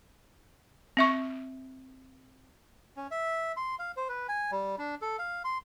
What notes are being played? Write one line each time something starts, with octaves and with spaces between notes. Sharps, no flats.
C4 E5 C#6
C#4
E5
C6
F5
C5
B4
G#5
G3
D4
A4
F5
C6